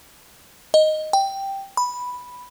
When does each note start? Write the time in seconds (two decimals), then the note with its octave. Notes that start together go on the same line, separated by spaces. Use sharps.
0.74 D#5
1.13 G5
1.77 B5